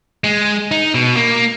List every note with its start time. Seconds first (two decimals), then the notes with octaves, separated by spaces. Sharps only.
0.24 G#3
0.71 D#4
0.94 B2
1.16 A#3